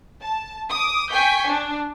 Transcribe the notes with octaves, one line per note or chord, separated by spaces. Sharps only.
A5
D6 D#6
G5 G#5 C#6 G6 B6
D4